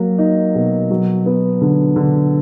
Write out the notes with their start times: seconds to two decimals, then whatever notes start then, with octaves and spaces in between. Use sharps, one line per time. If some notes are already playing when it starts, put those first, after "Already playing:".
Already playing: F#3 A#3
0.18 D#4
0.55 B2
0.91 F#3
1.26 B3
1.61 D3
1.96 D3